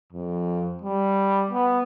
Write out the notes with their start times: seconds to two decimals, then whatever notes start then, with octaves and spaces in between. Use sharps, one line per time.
0.12 F2
0.82 G3
1.51 B3